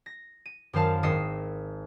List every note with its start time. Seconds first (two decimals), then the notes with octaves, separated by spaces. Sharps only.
0.06 A#6
0.46 D#7
0.73 F#2 D#3 C5 F5 A5
1.03 G#1 D#5 E6 C7 C#7